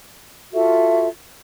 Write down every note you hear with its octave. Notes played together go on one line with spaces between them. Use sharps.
F4 F#4 A4 E5